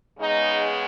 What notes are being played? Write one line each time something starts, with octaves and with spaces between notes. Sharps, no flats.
C#3 G#3 B3 D#4